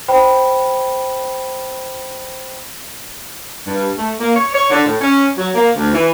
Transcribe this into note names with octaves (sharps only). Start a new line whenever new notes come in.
C5 G5 B5
G2
A3
A#3
C#5
C#5
D3
A2
C#4
F#3
A#3
D2
E3